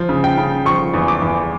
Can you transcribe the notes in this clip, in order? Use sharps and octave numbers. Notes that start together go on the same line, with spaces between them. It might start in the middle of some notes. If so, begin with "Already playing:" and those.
Already playing: F3
C#3
G5
C#3
F3 C#6
E2
D6
E2